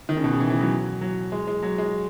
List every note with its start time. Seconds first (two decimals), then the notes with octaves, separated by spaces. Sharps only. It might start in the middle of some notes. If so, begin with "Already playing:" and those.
0.09 D#3
0.17 C#3
0.24 B2
0.32 C#3
0.40 E3
0.50 E3
0.60 F#3
1.01 F#3
1.32 G#3
1.47 G#3
1.63 F#3
1.78 G#3